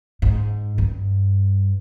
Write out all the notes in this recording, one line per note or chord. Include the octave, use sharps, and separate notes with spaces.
G#2
G2